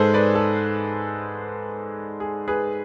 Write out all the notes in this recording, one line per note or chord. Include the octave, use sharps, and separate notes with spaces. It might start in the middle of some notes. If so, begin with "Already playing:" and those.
Already playing: G#2 G#3 G#4 A4 B4 C5
B4 D5
A4
G#4
G#4 B4